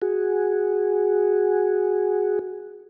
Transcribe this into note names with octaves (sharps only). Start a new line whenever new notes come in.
F#4 G#4